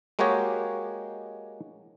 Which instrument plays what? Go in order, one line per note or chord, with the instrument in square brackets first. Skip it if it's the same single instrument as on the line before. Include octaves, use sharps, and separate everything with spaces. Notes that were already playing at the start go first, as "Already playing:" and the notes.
[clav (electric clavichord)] G#3 A#3 F#4 G4 C#5 D#5